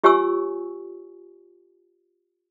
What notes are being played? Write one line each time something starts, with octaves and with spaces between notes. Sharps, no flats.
F4 G4 C#5 G#5 C#6 E6